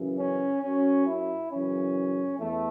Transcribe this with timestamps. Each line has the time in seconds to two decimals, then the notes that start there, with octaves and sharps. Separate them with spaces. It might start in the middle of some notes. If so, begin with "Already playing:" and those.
Already playing: F#2 C#3 E3
0.19 C#4
0.63 F#2 F#3 C#4
1.07 E4
1.51 F#2 C#3 E3 C#4
2.40 E2 A3